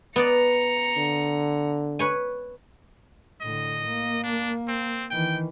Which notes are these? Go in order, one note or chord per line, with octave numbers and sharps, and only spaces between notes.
B3 D5 A#5 C#7
D3
B4 C#5 G#5
A2 D3 D#5
A#3
D4
C4
D#3 E3 G5